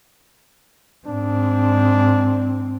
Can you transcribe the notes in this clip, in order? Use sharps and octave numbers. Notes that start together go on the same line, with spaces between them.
G#2 C4 D4